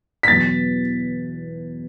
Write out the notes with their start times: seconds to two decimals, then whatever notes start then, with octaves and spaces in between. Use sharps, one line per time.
0.23 B6
0.28 E2 B2 F#3 A6